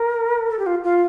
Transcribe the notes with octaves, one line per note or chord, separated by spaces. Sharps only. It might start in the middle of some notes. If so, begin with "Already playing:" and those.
Already playing: A#4
A4
G4
F4
F4